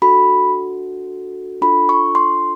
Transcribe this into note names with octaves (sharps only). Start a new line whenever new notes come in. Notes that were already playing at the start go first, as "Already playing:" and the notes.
D4 F#4 A4 B5
D4 F4 A4 B5
C#6
C6